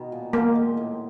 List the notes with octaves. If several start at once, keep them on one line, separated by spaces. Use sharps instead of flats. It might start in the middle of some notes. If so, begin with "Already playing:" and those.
Already playing: B2 D#3
A#2
G#3 A#3
G#3
A2